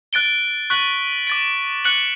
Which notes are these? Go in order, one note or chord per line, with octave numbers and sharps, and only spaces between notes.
F#6 A6 D7 G7
C#6 F#6 B6 F#7
D6 A6 D7
F#6 C#7 F#7